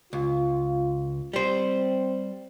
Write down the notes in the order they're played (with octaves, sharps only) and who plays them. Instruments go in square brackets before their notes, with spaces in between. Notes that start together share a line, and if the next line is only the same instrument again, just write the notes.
[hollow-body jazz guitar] C#2 [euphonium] F4
[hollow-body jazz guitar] G3 C5 [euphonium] C4